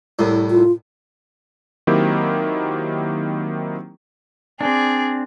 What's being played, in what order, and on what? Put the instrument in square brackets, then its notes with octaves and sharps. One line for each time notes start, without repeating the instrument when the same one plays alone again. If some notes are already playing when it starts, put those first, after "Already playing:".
[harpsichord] C2 A2
[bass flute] F4
[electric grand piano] D#3 F#3 A#3 C4 E4 G4
[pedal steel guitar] C4 D4 [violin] G#4 D5